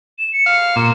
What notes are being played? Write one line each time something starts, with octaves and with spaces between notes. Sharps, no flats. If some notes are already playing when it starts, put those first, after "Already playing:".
E7
C#7
F5
A#2 E7